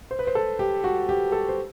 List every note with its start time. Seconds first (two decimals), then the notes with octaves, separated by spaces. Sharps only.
0.11 C5
0.19 B4
0.27 C5
0.35 A4
0.59 G4
0.84 F#4
1.09 G4
1.32 A4
1.49 C5